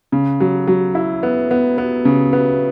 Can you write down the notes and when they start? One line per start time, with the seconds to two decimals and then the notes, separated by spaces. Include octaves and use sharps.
0.12 C#3
0.40 F#3
0.68 F#3
0.95 E4
1.23 B3
1.51 B3
1.78 B3
2.05 C#3
2.33 B3